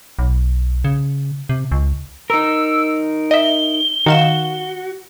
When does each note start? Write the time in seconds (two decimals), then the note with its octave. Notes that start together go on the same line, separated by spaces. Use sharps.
0.19 B1
0.84 C#3
1.49 C3
1.72 C#2
2.30 D#4 A#4 E6
3.31 D#5 E5 G7
4.06 D#3 F#4 F5 E7